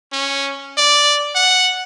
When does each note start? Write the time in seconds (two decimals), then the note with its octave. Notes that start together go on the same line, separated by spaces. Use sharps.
0.12 C#4
0.78 D5
1.35 F#5